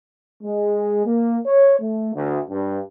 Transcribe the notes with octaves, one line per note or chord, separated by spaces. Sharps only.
G#3
A#3
C#5
A3
D2
G2